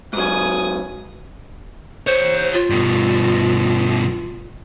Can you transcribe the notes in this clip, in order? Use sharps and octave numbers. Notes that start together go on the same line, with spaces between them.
G#2 F#3 G#5 D#6
G4 C5 C#5
F4
G2 B2